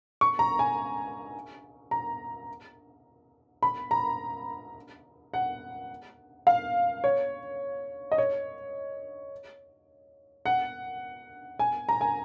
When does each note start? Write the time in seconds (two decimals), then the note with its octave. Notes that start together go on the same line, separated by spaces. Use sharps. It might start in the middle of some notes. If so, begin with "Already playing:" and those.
0.21 C#6
0.39 A#5
0.59 G#5
1.91 A#5
3.63 B5
3.91 A#5
5.34 F#5
6.47 F5
7.04 C#5
8.12 D#5
8.18 C#5
10.46 F#5
11.59 G#5
11.89 A#5
12.01 G#5